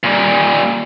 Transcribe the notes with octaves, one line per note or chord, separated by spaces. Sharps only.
A#2 G3